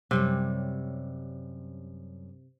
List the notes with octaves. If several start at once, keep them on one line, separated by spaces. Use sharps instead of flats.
F#2 C3 G3 C#4